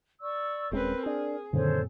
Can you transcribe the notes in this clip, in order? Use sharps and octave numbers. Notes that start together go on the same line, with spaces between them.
D5 C#6 E6
D#1 G#3 C4 C#4 A#4 B4
D4 G#4
F#2 A#2 D3 D#3 C4 A4 C5 C#5